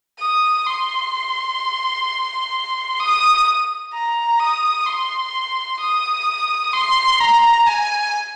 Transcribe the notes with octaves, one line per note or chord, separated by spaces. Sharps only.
D#6
C6
D#6
A#5
D#6
C6
D#6
C6
A#5
G#5